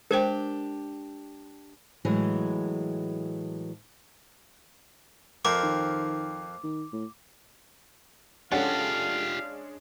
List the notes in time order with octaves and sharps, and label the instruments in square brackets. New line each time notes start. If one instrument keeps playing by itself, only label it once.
[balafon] G#3 C5 G5 [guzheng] D4 G4 [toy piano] A#4
[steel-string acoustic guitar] A2 E3 F#3 G#3
[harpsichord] F2 C4 A#4 [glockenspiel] D6
[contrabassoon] D#3
D#3
A2
[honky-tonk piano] G#3 C#4 D4 [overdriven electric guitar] F4 G4 [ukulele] A4 F#5 [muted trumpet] F5